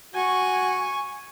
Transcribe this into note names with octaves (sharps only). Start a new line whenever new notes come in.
F#4 G#5 C#6